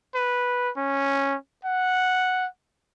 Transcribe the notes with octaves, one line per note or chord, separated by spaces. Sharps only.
B4
C#4
F#5